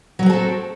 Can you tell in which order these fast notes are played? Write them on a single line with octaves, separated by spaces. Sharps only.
F#3 F#4 C4 A4 A3